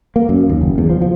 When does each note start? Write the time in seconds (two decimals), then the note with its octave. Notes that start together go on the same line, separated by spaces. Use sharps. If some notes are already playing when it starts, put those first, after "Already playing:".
0.16 A#3
0.29 F#2
0.49 D#2
0.61 F#1
0.78 E2
0.90 F3
1.02 F3